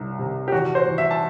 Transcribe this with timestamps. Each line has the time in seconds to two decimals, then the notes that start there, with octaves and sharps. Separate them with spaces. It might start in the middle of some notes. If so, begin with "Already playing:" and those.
Already playing: C2
0.19 C3
0.48 G4
0.52 E2 F#4
0.75 C5
0.87 E2
0.98 E5
1.11 A5